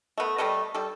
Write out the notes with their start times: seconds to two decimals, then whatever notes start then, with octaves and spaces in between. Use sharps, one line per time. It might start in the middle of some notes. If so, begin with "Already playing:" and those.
0.18 A3 B3
0.38 G3 A3 A4 D#5
0.74 G3 A4